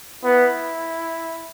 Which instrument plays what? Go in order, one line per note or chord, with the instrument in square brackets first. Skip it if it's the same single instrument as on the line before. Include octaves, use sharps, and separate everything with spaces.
[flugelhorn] B3 [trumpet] E4